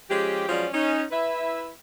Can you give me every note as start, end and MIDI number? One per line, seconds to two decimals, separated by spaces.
0.10 0.48 53
0.10 0.48 56
0.10 0.48 61
0.10 0.48 67
0.48 0.66 53
0.48 0.66 54
0.48 0.66 56
0.48 0.66 61
0.48 0.66 65
0.48 0.66 74
0.73 1.03 61
0.73 1.03 63
1.11 1.70 64
1.11 1.70 71
1.11 1.70 76